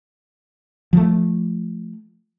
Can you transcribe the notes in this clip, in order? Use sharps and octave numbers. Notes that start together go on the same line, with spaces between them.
F3 A3